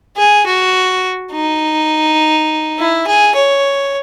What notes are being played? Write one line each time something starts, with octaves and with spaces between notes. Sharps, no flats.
G#4
F#4
D#4
E4
G#4
C#5